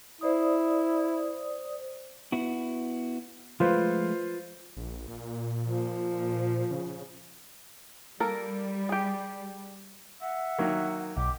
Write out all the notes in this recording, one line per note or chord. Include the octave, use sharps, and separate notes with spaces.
E4 C5 D5 D#6
B3 E4 F#4
F3 G#3 A3 F4 B4 C5
A#1
A#2
F3
C#3
G3 A#3 A4 A#4
G4 G#4
E5 F#5
D#3 F#3 A#3
B1 G4 D6